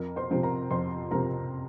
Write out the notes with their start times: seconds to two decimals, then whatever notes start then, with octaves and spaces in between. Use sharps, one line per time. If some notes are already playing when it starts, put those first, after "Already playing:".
Already playing: F2 A#4 A#5
0.16 C5 C6
0.30 C3 F3 C4
0.43 A#4 A#5
0.70 F2 C5 C6
1.11 C3 F3 C4 A#4 A#5